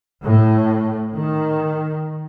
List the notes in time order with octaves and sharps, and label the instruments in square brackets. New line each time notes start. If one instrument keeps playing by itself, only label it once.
[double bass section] A2
D#3